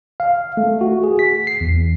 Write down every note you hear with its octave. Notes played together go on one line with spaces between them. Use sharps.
F5
A3
F#4
G#4
B6
C7
E2